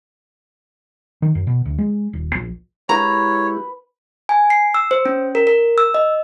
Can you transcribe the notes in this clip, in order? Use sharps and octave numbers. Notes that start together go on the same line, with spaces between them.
D#3
F#2
B2
D2
G#3
D#1
A#1
G#3 E4 G4 B4 C#5 A#5
G#5
C7
E6
C5
C#4
A#4
A#4
E6
D#5